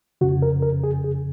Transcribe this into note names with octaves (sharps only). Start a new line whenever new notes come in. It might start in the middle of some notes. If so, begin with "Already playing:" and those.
F2 C#3 F#4
A#4
A#4
G#4
G#4